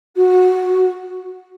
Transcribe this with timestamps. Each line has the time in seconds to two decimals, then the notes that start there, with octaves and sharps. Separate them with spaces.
0.16 F#4